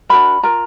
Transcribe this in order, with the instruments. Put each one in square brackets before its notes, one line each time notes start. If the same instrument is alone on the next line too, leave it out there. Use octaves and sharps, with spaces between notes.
[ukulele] D4 F#4 A#4 B5
F4 A#4 A#5